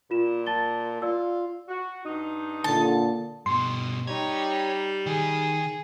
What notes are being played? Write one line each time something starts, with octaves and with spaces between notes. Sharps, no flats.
A#2 F4 E7
A5 A6 G7
F4 D5 E6
F#4
G2 D#4
A#2 D3 A5
G2 B2 C6
G3 D#4 G4 C#5
D#3 G#4